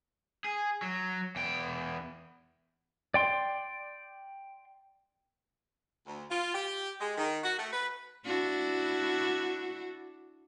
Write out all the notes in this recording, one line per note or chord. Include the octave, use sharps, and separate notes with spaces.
G#4
F#3
E2 G5
D5 G5 C6
D2
F4
G4
G#3
D#3
F#4
A3
B4
D4 E4 F#4